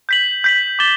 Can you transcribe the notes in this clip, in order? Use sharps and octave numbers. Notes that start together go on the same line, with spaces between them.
G6 B6 F#7
G6 B6 F#7
D6 A6 E7 G7